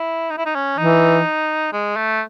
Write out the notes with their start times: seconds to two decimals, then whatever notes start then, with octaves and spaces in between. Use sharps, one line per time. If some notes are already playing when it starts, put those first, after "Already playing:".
Already playing: E4
0.30 D#4
0.38 E4
0.46 D#4
0.55 C#4
0.78 E3 D#4
1.73 G#3
1.96 A3